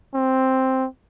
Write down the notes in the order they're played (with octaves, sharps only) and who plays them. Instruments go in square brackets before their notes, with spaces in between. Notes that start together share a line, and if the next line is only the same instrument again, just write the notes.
[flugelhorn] C4